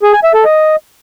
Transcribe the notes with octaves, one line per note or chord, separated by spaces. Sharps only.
G#4
G#5
E5
A4
D#5